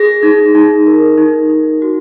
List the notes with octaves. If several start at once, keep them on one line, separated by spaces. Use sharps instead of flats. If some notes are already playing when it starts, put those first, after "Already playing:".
Already playing: G#4 A#6
D#4
D#4
A#4
D#4
D#4
F#4